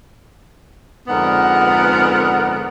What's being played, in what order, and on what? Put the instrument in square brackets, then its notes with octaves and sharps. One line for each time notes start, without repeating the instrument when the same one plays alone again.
[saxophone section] F2 G#2 D3 B3 A#4 F#5